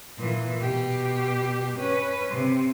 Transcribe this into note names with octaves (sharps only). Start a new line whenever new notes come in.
A#2 E3
B2 G4
C#4 B4
C3